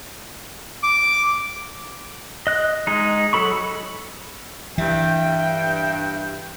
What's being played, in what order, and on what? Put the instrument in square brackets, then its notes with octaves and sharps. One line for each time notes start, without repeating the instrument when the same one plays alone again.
[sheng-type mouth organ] D6
[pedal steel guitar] D#5 F#6
G#3 D#4
F#3 A4 B5 C#6
[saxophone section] G2 E5 [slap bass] E3 [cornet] G5